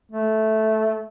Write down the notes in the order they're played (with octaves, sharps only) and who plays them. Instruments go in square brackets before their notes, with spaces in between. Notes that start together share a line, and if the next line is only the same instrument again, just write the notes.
[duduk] A3